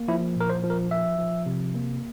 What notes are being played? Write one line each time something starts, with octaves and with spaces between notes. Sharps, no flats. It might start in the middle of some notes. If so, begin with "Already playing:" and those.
Already playing: A#3
F3 E4
A#2 A#4
C5
F3
A#4
F3 E5
F3
C3
A#3